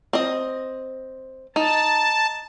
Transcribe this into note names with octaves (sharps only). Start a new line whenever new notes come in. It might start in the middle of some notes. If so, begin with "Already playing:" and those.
C4 D#5
D#4 A5